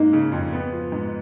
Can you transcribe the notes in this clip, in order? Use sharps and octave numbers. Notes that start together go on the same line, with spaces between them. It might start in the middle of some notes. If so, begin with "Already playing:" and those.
Already playing: G#2 A#3 D#4
C#3
F2
B3
F3
G#2